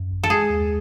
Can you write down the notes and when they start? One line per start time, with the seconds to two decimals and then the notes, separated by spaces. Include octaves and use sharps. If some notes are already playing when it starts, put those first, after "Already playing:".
Already playing: F#2
0.11 G#1
0.23 A4
0.30 G#3 G#4
0.50 D#2